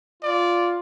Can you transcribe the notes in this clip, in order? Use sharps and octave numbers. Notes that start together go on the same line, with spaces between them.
F4 D5